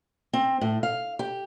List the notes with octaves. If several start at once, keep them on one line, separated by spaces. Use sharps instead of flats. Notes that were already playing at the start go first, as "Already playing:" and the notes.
C4
A2
F5
G4